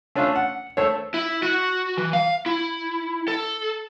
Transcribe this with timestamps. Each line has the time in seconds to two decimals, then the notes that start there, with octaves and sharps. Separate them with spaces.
0.16 A3 C#4 D4 F4
0.35 F#5
0.77 A3 A4 C5 C#5
1.14 E4
1.43 F#4
1.97 E3
2.13 F5
2.46 E4
3.28 A4